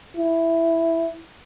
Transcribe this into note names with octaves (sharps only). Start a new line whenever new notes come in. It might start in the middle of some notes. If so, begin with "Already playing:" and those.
E4